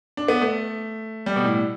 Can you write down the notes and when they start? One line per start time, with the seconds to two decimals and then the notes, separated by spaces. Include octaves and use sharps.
0.17 D4
0.28 B3
0.41 A3
1.26 G3
1.36 B2
1.44 A2